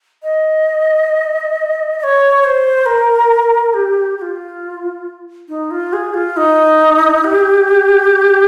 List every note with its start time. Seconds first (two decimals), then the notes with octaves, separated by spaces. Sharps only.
0.23 D#5
1.99 D#5
2.04 C#5
2.42 C#5
2.45 C5
2.86 A#4
3.74 G4
4.17 G4
4.22 F4
5.49 D#4
5.71 F4
5.93 G#4
6.14 F4
6.37 D#4
7.24 G4